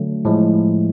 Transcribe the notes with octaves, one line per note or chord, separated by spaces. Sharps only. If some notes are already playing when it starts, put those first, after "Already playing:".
Already playing: D3 F#3 A3
A2 F3 G#3